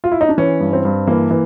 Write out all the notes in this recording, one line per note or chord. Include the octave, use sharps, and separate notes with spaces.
F4
E4
D#4
D4
E3 C#4
G2
C4
G2
E3 A#3
E3